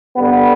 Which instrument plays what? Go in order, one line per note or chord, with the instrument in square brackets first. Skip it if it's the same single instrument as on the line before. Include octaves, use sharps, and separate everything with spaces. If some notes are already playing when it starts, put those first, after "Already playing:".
[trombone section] G2 D3 G3 B3